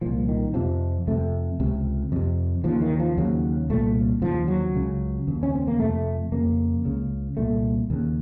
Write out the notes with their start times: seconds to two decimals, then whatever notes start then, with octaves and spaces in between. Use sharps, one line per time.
0.01 C2 A#2 F3
0.28 D#3
0.54 F2 C3 F3
1.07 F2 C3 A3
1.60 C#2 C3
2.12 F2 C3
2.64 D#2 C#3 F3
2.82 D#3
3.00 F3
3.17 D#2 C#3 F#3
3.70 C2 A#2 A3
4.21 D#2 C#3 F3
4.48 F#3
4.74 C#2 C#3
5.27 D#2 C#3
5.43 C#4
5.55 C4
5.67 A#3
5.79 F2 C3 A3
6.32 F2 C#3 A#3
6.85 C#2 C#3
7.37 C2 A#2 A3
7.90 D#2 C#3